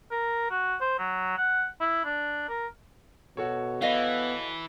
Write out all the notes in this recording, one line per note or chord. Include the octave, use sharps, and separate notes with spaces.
A#4
F#4
C5
F#3
F#5
E4
D4
A#4
B2 F#4 A4 C#5
E3 B3 D#5 F5